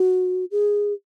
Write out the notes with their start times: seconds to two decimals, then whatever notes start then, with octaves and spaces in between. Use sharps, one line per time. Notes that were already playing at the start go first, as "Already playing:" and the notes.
Already playing: F#4
0.51 G#4